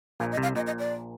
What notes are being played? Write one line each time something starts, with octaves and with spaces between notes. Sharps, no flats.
A#1 A#2 F5
D#5
C2 C3
F5
A#1 A#2 D#5
D#5
D5